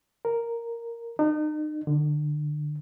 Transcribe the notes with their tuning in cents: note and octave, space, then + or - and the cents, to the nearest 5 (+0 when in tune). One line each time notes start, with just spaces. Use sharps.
A#4 -5
D#4 -35
D3 +25